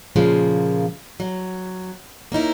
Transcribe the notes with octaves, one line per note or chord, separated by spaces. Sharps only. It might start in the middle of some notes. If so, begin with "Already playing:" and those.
A#2 C#3 F3 G#3 A#3
F#3
A#3 C#4 D#4 E4